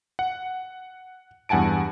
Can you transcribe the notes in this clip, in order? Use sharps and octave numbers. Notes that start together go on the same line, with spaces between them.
F#5
E2 G2 F#5 G#5 A5 D7